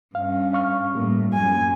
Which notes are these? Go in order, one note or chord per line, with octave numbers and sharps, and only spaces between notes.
G2 C#4 F5
F5 C#6 F6
A2 G3 A#3
F#2 G#5